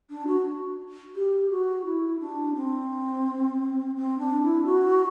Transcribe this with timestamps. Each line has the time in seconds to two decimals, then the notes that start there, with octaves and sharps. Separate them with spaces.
0.10 D4
0.27 F#4
1.16 G4
1.51 F#4
1.85 E4
2.20 D4
2.55 C4
3.96 C4
4.18 D4
4.42 E4
4.65 F#4